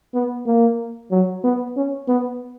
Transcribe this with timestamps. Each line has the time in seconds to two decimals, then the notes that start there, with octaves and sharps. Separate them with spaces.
0.14 B3
0.47 A#3
1.11 F#3
1.44 B3
1.77 C#4
2.08 B3